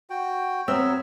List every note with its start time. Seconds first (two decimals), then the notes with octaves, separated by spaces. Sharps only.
0.10 F#4 G5
0.68 F#3 B3 C4 A#4 C#5 E5